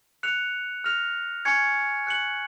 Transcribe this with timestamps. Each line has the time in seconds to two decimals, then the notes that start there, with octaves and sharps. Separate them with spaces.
0.23 F#6 C#7 F7
0.84 F6 A#6 F7
1.45 G#5 C#6 G#6 C#7
2.07 F#6 C#7 F#7